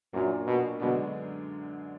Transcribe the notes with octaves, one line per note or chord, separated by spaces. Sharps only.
F#2 A#2 F#3 A#3 D4
B2
F#2 B2 D3 G#3 B3 D4